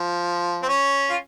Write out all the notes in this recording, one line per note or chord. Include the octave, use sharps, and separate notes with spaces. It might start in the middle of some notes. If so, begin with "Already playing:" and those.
Already playing: F3
C4
C#4
F4